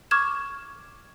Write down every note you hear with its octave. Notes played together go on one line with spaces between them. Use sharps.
C#6 D6 F6 G#6 E7